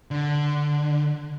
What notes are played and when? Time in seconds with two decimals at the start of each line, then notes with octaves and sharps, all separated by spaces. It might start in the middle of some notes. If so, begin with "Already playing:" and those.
0.11 D3